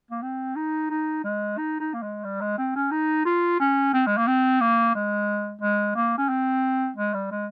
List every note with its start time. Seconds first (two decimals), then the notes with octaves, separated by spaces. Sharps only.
0.11 A#3
0.22 C4
0.56 D#4
0.90 D#4
1.24 G#3
1.58 D#4
1.80 D#4
1.94 A#3
2.02 G#3
2.24 G3
2.41 G#3
2.58 C4
2.76 C#4
2.92 D#4
3.26 F4
3.60 C#4
3.93 C4
4.07 G#3
4.17 A#3
4.27 C4
4.61 A#3
4.95 G#3
5.62 G#3
5.96 A#3
6.18 C#4
6.29 C4
6.96 G#3
7.14 G3
7.31 G#3